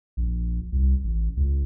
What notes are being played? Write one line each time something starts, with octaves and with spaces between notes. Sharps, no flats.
A#1
C2
A1
C#2